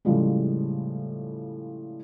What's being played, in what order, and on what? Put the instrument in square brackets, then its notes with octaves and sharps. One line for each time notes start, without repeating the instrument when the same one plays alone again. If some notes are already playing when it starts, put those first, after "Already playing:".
[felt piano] A2 C#3 F3 G3 G#3